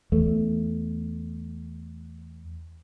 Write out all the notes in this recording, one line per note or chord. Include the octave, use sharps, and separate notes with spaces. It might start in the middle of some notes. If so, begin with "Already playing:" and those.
E2 A3